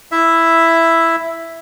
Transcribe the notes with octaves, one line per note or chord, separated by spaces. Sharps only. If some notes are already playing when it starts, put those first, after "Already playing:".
E4 E5